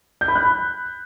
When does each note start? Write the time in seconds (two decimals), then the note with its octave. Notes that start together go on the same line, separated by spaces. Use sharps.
0.21 G6
0.28 B5
0.35 F#6
0.43 B5